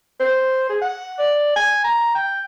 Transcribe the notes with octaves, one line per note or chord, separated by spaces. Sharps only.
C5
G#4
F#5
D5
G#5
A#5
G5